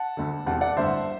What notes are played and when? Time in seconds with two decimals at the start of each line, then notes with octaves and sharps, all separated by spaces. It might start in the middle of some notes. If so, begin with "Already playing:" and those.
Already playing: F#5 A5
0.17 D2 D3
0.46 E1 E2 C3 F#5 A5
0.61 D5 F#5
0.76 A1 G2 D3 C5 E5